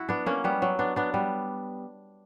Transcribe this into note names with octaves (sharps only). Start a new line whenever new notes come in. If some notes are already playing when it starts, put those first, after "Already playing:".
Already playing: E4 F#4
B3 D4
A#3 C#4
G3 B3
F#3
B3 D4
B3 D4
G3 B3